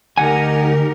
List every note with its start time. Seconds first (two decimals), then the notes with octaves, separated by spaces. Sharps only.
0.18 D2 D#4 G4 A#4 F#5 G#5